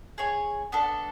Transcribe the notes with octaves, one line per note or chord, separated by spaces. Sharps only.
G#4 C#5 G#5
B3 D4 A4